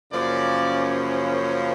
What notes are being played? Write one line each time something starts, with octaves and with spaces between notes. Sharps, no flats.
F#2 C#3 F3 A#3 C#4 D5